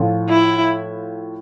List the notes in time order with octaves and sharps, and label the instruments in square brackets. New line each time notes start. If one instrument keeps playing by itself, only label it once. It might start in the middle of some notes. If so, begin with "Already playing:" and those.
Already playing: [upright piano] A2 F3 C4 F4 A4
[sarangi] E4